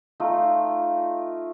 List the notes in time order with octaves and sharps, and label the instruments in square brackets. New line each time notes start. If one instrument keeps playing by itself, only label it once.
[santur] A3 D#4 F4